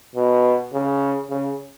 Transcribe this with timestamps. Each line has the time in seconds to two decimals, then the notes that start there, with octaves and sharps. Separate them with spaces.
0.15 B2
0.73 C#3
1.30 C#3